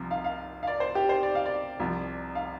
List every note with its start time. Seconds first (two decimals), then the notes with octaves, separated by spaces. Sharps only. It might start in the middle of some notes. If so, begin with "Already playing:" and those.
Already playing: C2 C3 F3
0.11 F5
0.24 F5
0.63 F5
0.67 D5
0.80 C5
0.95 G4
1.09 C5
1.23 D5
1.35 F5
1.46 D5
1.80 C2 C3 F3
2.35 F5